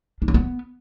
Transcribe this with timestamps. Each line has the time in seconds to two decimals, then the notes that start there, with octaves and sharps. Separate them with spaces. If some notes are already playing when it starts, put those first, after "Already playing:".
0.22 D4
0.28 C#4
0.34 B3